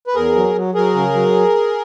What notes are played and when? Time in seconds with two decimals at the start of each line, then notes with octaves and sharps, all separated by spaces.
0.07 B4
0.15 E2 G#4 A#4
0.35 F#3
0.55 F#3
0.74 F#3 G#4 A#4
0.94 C#3
1.14 F#3